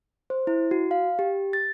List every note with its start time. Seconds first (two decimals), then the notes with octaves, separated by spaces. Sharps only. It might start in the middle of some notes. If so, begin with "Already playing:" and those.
0.30 C5
0.47 E4
0.71 F#4
0.91 F5
1.19 G4
1.53 A6